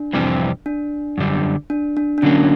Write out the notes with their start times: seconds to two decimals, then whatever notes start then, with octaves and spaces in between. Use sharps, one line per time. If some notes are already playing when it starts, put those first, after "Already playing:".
Already playing: D4
0.13 F2 C3 E3 G3 C4
0.66 D4
1.18 F#2 D3 G3
1.70 D4
1.97 D4
2.18 D4
2.22 D3 F#3 A#3 C#4